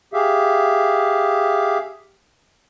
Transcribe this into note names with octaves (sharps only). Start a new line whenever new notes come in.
G4 G#4 E5 F5